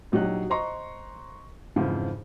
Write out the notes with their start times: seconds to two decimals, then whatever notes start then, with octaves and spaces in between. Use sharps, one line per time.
0.12 A#1 F#3 D#4 G4 F#6
0.50 C5 D#5 A#5 C6 C#6
1.76 F2 G#2 C#3 E3 E4 F4